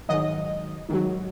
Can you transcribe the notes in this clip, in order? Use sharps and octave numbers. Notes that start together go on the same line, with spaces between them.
G#2 D#3 F#3 D#5
G#2 D#3 F#3